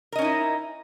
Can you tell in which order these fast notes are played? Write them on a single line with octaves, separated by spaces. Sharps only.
A#4 D#5 C#4 D#4 E4